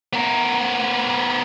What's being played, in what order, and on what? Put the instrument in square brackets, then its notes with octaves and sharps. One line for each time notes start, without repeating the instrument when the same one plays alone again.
[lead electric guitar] B3 A#4